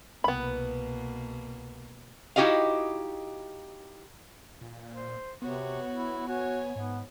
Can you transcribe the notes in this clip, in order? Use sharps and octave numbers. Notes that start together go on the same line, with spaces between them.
C2 B2 A#3 B3 B5
D#4 E4 F#4 G4 D#5 F5
A#2
C5
C3 B3 F#4 C#5
E4
F#4 C#5 G#5
G#2 B3